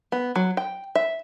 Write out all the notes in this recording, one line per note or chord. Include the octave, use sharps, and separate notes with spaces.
B3
F#3
G5
E5